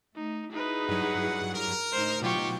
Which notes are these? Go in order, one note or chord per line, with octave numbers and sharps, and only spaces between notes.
A3 D#4
D#4 E4 F#4 G#4 B4
G2 F#3 F#5
A#4
A2 D3 D#4 C5
B2 F#3 F4 G4 G5 C#6